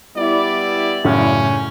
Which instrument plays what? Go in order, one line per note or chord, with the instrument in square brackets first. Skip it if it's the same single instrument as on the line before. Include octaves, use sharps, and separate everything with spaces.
[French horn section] G3 B3 E4 [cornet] D5
[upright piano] F#2 A2 C#3 [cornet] C#4